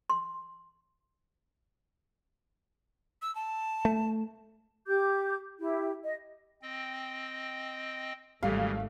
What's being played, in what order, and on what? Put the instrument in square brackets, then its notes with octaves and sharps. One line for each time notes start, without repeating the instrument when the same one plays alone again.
[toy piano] C6
[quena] E6
A5
[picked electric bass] A3
[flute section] G4 D6 G6
E4 G4
D#5
[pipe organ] C4 D#5 G5
[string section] G#1 A3 [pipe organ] C#3 E3 [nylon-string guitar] G3 [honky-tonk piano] F5